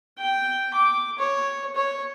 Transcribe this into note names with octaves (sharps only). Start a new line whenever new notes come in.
G5
D6
C#5
C#5